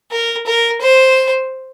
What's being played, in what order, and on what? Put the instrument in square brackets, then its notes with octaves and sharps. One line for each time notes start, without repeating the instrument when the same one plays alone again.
[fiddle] A#4
A#4
C5